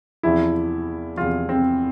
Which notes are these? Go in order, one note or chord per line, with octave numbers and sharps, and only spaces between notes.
E2 C3 F3 E4
E2 C3 F3 F4
C4